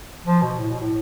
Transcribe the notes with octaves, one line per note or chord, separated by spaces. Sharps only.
F3
B2
A2
B2
A2